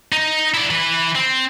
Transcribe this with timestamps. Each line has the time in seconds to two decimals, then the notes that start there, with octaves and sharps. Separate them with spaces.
0.12 D#4
0.54 E4 D5
0.70 E3 B4
1.15 C4